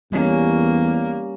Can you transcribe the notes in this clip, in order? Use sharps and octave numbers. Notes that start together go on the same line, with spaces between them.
E2 G3 A#3 C#4